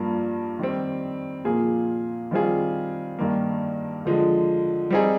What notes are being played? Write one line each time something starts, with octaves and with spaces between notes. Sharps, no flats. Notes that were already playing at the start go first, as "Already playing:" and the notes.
Already playing: G2 F3 A#3
D#3 G3 C4
A#2 F3 A#3 F4 G#4
D#3 G3 C4 F4 G#4
G2 D#3 A#3
D3 F3 G#3
G3 C4 D#4 G#4